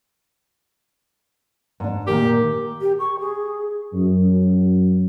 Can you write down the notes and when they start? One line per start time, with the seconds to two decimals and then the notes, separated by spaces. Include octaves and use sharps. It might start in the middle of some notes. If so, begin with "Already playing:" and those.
1.80 G#2 D4
2.07 A#2 D#3 G4 A#4
2.81 G4
2.99 C#6
3.20 G#4
3.93 F#2